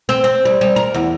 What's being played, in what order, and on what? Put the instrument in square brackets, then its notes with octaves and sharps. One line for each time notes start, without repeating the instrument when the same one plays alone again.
[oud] C4
C4
G3
G3
A#4
E2